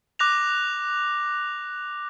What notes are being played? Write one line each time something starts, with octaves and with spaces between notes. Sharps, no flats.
D6 F#6 A#6 F7